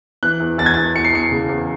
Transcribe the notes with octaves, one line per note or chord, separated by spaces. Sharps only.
E3 F#6
E2
E2 A6
G#6
E2 A6
E2 C#7
C7
E2 C#7
C#3
E2